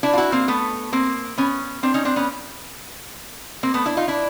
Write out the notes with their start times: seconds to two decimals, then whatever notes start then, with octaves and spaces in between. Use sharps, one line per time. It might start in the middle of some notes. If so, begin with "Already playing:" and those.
0.03 D4 E4
0.13 F4
0.17 E4 F#4
0.32 A#3 C4
0.48 A3 B3
0.93 A#3 C4
1.38 B3 C#4
1.83 C4 D4
1.94 C#4 D#4
2.05 C4 D4
2.16 B3 C#4
3.63 A#3 C4
3.74 A3 B3
3.86 D4 E4
3.97 D#4 F4
4.08 D4 E4